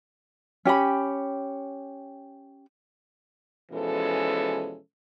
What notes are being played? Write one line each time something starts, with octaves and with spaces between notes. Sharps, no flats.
C#4 G4 G5 B5
B2 E3 F3 G#3 C#4 A4